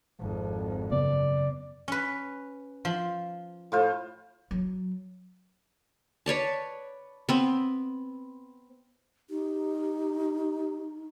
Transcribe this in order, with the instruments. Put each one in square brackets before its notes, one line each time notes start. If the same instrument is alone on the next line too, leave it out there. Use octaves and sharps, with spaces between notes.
[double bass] G#1 F2
[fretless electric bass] F#2 C#3 B3 [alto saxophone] D5
[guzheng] C#4 B4
F3
[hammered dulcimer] A2 F4 C5
[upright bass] F#3
[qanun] B4 C#5 D5 A5
B3 C4
[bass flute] D#4 [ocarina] G4